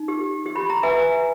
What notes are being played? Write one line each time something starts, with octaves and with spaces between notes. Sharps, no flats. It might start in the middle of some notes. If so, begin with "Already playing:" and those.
Already playing: D#4
G4
G4
B5
A#5
B4 E5 G#5